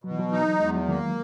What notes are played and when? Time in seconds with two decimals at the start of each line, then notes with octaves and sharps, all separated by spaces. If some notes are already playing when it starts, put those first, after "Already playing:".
0.04 B2 F#3
0.11 E3
0.19 F#3
0.32 D#4
0.60 E2 G#3
0.75 F#3
0.88 D#3 A#3